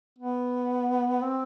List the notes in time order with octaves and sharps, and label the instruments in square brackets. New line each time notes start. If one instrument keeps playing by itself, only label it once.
[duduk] B3
C4